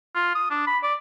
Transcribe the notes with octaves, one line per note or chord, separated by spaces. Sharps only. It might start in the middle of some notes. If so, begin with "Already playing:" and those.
F4
D#6
D4
B5
D5